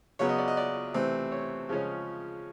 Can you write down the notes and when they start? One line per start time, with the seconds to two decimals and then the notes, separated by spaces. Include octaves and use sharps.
0.19 C#3 F#3 B3 C#5
0.29 D#5
0.38 D5
0.48 D#5
0.57 D5
0.94 C3 E3 A3 C4
1.32 C#5
1.69 C#3 F3 G#3 C#4